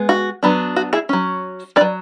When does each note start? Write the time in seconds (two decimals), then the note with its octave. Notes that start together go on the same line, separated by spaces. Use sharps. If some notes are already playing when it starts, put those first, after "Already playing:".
Already playing: G#3 B3
0.09 F#4
0.43 F#3 B3 D4
0.76 F#4
0.93 E4 G#4
1.09 F#3 C#4
1.76 C#4 B4 D5
1.81 F#3